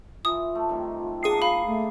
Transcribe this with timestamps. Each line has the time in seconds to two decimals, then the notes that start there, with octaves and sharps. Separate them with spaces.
0.25 E3 F4 D#6
0.55 A3
0.69 C3 D#3 G3
1.23 G#3 A#3 D4 G#4 D#6 C7
1.42 F5 B5
1.66 A3